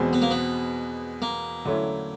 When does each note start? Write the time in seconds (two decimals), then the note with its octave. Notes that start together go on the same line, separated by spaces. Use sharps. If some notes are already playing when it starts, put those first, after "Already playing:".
Already playing: E2 B2 G#3 C4
0.13 B3
0.22 A#3
0.31 B3
1.22 A#3
1.66 D3 F#3 A3 C#4 E4